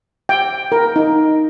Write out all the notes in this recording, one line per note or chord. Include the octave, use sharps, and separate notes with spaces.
G5
A#4
D#4